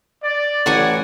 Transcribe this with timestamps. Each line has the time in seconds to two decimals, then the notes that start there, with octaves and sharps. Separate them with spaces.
0.24 D5
0.66 A1 F#4 F#5 G#5